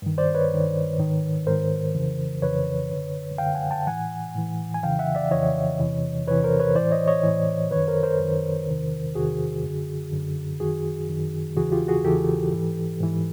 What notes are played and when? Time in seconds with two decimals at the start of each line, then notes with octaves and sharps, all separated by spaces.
0.02 G2 D#3
0.18 C5 D5
0.35 B4 C#5
0.51 G2 D#3
0.98 G#2 D#3
1.47 G#2 D#3 A#4 C5
1.94 F2 C#3 E3
2.42 F2 C#3 E3 B4 C#5
2.90 F#2 D3
3.38 F#2 D3 F5 G5
3.55 F#5 G#5
3.71 G5 A5
3.87 A2 E3 F#5 G#5
4.35 A2 E3
4.74 G#5
4.83 F2 C#3 E3 F5 G5
4.99 E5 F#5
5.15 D5 E5
5.31 F2 C#3 E3 C#5 D#5
5.80 E2 C3 E3
6.27 E2 C3 E3 B4 C#5
6.44 A#4 C5
6.60 B4 C#5
6.75 A2 E3 C5 D5
6.91 C#5 D#5
7.07 C#5 D#5
7.24 A2 E3
7.71 F#2 D#3 B4 C#5
7.88 A#4 C5
8.03 A#4 C5
8.19 F#2 D#3
8.68 E2 C3 D#3
9.15 E2 C3 D#3 F#4 G#4
9.63 F#2 D3
10.12 F#2 D3
10.60 F#2 D#3 F#4 G#4
11.09 F#2 D#3
11.57 E2 C#3 E3 F#4 G#4
11.72 F4 G4
11.88 F#4 G#4
12.04 E2 C#3 E3 G4 A4
12.52 G#2 E3
13.00 G#2 E3